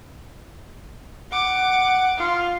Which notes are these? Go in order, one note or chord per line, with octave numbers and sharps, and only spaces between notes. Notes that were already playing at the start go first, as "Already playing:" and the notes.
F#5 D6
F4